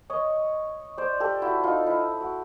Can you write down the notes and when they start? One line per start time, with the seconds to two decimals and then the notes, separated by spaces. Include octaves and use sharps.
0.10 C#5 D#5
0.98 C5 D5
1.20 G4 A4
1.42 E4 F#4
1.64 D#4 F4
1.87 E4
2.20 F#4